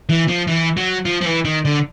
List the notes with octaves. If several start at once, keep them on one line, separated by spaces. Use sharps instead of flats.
E3
F3
E3
F#3
F3
F3
E3
D#3
D3